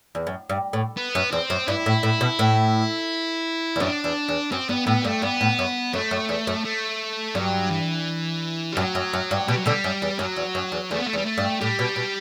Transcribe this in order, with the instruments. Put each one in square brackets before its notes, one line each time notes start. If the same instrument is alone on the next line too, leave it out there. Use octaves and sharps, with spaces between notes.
[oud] E2
F#2
G2
A2
[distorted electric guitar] B3
[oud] F#2
[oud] E2 [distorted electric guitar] C4
[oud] F#2
[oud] G2 [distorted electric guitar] E4
[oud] A2
A2
B2
A2
E2
[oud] F#2 [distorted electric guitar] D4
[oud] E2
E2
[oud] F#2 [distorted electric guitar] C4
[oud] G2 [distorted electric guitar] B3
[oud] A2 [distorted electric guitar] B3
[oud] G2 [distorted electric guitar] A3
[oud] G2 [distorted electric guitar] B3
[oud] A2
F#2
[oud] F#2 [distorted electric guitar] A3
[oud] F#2
E2
F#2
[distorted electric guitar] A3
[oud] G2 [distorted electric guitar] F#3
[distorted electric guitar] E3
G3
[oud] F#2 [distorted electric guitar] F#3
[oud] F#2
F#2
G2
[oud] B2 [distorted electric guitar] G3
[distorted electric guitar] F#3
[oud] B2 D3 [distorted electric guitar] G3
[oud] F#2
E2
[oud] F#2 [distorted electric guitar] F#3
[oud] E2
F#2
E2
[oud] E2 [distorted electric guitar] A3
[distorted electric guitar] B3
A3
[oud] E2
[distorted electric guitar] G3
A3
[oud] G2
[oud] A2 [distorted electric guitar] G3
[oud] B2
B2